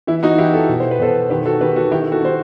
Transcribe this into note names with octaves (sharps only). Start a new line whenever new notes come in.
E3 E4
D#4 F#4
E3 E4 G4
F#4 A4
B2
C5
B4
B2 A4 C5
D#3 G4 B4
F#4 A4
D#3 G4 B4
F#4 A4
D#3 E4 G4
F#4 A4
D#3 C5